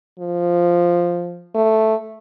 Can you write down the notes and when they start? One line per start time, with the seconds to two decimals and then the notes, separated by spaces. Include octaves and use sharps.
0.20 F3
1.55 A3